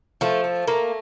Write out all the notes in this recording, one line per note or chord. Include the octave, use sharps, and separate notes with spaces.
F3 A3
A3
A3 A#3